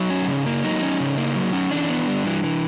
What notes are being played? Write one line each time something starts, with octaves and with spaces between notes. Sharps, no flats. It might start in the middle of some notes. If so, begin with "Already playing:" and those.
Already playing: F#3 D#4
C#4
C#3
A#3
F#3 D#4
C#4
C#3
A#3
F#3
C#4
E3 D4
B3
G3
E3
E3